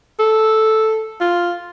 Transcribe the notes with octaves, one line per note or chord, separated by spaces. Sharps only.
A4
F4